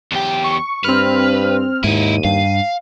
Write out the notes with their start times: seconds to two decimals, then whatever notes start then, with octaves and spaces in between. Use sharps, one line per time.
0.12 E2 G4
0.44 C#6
0.84 G2 C4 B4 F6
1.84 D#2 G#2 D#4 E4 D#7
2.25 G2 F5